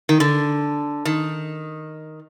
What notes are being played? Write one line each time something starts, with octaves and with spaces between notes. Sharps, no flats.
D#3
D3
D#3